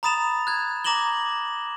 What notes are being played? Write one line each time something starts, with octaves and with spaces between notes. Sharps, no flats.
A#5 B5 D#6 A6 E7 F7
F#6 G#6
A#5 D6 A#6 E7 F#7 G7